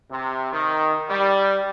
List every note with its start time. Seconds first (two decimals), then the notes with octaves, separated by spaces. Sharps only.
0.10 C3
0.52 D#3
1.09 G3